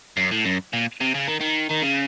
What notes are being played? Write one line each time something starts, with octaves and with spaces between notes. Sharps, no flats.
F#2
A2
F#2
A#2
C3
C#3
D#3
D#3
D#3
C#3